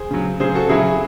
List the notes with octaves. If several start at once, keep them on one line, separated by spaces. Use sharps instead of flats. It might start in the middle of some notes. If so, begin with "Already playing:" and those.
Already playing: G#4 C5
C#3 F#3
C#3 F#3 G#4 C5
F#4 A4
C#3 F#3 E4 G#4